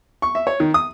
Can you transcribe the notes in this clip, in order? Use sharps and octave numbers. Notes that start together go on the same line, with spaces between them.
C#6
E5
C#5
D#3
D#6